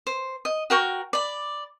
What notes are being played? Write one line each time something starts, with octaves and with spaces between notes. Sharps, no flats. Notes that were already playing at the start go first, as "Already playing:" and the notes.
C5
D#5
F#4 A#4 G5 C#6
D5 B5